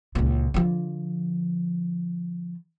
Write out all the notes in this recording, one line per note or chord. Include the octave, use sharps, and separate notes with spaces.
C#2 A#2
D3 F3